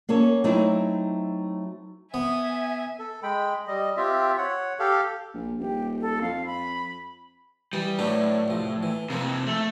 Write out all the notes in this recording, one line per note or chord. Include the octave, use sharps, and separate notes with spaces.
A#3 C#4 A4 C#5
F#3 A3 C4 D#4 E4
B3 E5 G#5
A4
G#3 G5 B5
G3 D#5
C4 F4 G4 E5
C#5 F#5
G4 A4 F5
A#1
D#1 G4
A4
F2 F5
B5
E3 G3 D#6
A2 F#3 D4 B4
C2 F3
E3
F2 C3 A#3 E4
A3